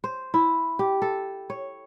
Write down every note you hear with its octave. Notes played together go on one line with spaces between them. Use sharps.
C5
E4
G4
A4
C#5